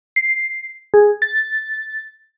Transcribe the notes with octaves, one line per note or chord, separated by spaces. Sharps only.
C7
G#4
A6